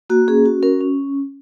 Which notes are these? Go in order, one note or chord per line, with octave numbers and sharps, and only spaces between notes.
A#3 F#4
C#4 G#4
F#4
C#4 A#4
C#4